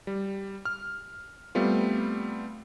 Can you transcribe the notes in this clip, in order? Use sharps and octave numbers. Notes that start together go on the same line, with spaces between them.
G3
F6
G3 A3 B3 C4 F4